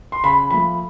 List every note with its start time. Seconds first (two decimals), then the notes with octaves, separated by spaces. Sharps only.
0.12 C6
0.24 C#3 B5
0.51 F3 A3 B5